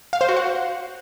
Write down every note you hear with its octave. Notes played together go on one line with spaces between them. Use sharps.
F5
C5
F#4
F#5